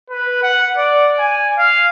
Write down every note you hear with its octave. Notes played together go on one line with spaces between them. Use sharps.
B4
F#5
D5
G#5
F5